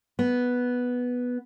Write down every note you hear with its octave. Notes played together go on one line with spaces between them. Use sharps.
B3